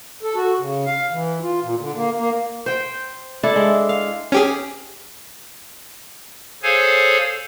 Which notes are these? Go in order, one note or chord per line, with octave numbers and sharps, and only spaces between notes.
A4
F#4
C#3
F5
E3
F4
A#2
D3
A#3
A#3
C5 G5
D4 E4 A4
G#3
F5
C#4 G4 G#4
G#4 A4 C5 C#5 F5 G#5